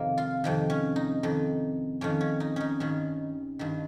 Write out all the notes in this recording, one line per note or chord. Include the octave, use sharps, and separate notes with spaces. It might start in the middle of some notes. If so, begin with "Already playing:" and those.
Already playing: F2 C3 D#3 A#3
F4
F2 C3 D#3
C#4
D#4
F2 D#3
F2 D#3 C#4
C#4
D#4
C#4 D#4
G2 D#3 C#4
G2 D#3